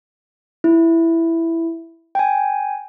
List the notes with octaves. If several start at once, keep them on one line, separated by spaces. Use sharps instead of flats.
E4
G5 G#5